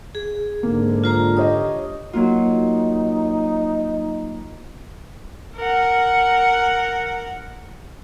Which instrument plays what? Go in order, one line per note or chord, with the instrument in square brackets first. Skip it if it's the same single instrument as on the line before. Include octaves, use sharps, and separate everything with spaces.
[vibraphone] G#4
[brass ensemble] G#2 D3 [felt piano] A#3
[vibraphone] F4 C5 A#5
[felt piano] G4 C#5 D#5 [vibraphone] D#6
[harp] F#3 A#3 F4 [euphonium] D#4
[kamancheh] A#4 F#5